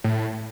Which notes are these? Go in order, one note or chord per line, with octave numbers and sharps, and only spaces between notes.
A2